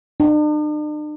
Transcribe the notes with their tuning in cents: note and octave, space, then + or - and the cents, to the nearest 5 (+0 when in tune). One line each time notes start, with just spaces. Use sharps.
D4 +45